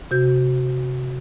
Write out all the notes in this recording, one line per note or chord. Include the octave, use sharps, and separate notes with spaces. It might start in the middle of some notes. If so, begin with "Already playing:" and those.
C3 F#4 G6